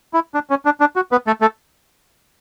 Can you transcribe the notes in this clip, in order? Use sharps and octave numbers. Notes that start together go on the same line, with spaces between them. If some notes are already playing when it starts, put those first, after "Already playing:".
E4
D4
C#4
D4
D4
F#4
B3 B4
A3 A4
A3 A4